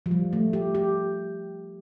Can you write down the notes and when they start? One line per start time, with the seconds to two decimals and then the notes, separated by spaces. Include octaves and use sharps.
0.06 F3
0.11 G3
0.33 A3
0.53 G4
0.75 G4